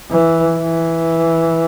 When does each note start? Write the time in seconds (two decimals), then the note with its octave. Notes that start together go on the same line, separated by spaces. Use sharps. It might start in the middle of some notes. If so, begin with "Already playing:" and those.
0.10 E3
0.57 E3